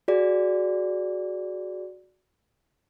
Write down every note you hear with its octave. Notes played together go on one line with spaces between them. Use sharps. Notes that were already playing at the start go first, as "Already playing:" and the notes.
F#4 G#4 D5